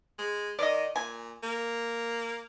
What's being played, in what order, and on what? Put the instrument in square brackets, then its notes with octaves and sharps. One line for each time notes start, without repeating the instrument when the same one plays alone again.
[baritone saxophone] G#3
[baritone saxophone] D#3 [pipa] D5 D#5
[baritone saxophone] A#2 [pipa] G#5
[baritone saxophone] A#3